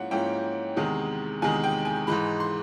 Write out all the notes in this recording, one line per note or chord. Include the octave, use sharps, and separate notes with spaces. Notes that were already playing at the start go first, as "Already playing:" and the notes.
Already playing: G#2 F3 A#3 C#4 E4 F#5
G#2 F3 A#3 C#4 E4 G5
E2 C3 D#3 G#3
E2 C3 D#3 G#3 G#5
G5
G#5
G#2 E3 G#3 B5
C6